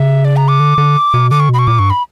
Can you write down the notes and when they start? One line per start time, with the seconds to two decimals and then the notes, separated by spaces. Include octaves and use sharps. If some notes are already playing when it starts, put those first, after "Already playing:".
Already playing: C#3 E5
0.25 D5
0.36 A#5
0.48 D6
0.60 D3
0.78 D3
1.14 B2
1.31 D3 D6
1.40 C#6
1.49 B2 B5
1.59 C#6
1.67 A#2 D6
1.78 G2 C#6
1.90 B5